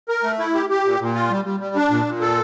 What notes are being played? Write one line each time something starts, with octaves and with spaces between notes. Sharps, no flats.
A#4
A3
E4
G4
G4
A#2
A#2
F4
G3
G3
G3
D4
A#2
A#2
A4